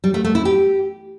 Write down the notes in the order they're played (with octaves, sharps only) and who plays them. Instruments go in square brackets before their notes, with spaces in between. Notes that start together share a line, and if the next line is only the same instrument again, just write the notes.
[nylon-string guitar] G3
A3
A3
E4
G4